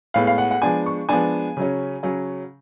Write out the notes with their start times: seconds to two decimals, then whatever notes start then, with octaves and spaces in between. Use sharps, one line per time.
0.14 A2 G#3 B3 F5
0.27 F5
0.38 F#5
0.51 F#5
0.62 F3 G#3 B3 D4 G#5
0.86 C#6
1.09 F3 G#3 B3 D4 G#5
1.57 C#3 F#3 C#4
2.03 C#3 F#3 C#4